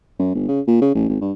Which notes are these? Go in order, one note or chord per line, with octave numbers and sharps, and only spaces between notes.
F#2
G1
C#3
A#2
C#3
A1
G#1
G2